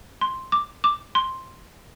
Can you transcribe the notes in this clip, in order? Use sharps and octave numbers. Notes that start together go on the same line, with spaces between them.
C6
D6
D6
C6